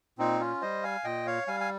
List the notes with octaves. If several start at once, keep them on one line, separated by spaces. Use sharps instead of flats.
A#2 C4 D#4
C#4 F4
G3 C5 D#5
F5 G#5
A#2 D#5 G5
C#5 F5
G3 F5 G#5
G#5